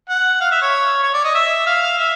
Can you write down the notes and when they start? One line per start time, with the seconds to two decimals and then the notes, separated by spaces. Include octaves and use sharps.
0.09 F#5
0.40 F5
0.51 E5
0.62 C#5
1.03 C#5
1.14 D5
1.24 D#5
1.35 E5
1.66 F5
1.82 F5
1.98 E5